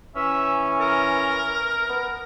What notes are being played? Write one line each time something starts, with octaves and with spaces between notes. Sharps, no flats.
E3 C#4 E5
A#4
B3